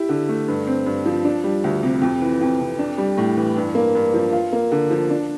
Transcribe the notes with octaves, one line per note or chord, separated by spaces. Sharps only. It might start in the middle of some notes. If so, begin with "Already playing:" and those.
Already playing: E4 G4
D3
A3
G2
C4
G2
F3
D4
G3
D2
C3
F2
E3
F2
C3
D4
G3
A2
E3
G2
A#3
G2
F3
F4
A#3
D3
F3
D4